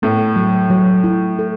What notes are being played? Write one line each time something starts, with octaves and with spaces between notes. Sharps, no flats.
A2 B3
F#3
F#3
E4
A4